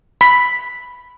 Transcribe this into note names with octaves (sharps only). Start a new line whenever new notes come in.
B5